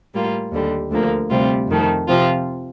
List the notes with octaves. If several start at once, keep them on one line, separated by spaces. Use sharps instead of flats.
A2 G3 A#3 F4
D#2 D3 G3
D2 D3 F3 A#3
D2 C3 G3 C4 F4
F2 D#3 A3
C3 F3 C4 F4